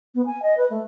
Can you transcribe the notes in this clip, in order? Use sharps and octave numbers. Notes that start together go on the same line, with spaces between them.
B3
G#5
D#5
B4
A3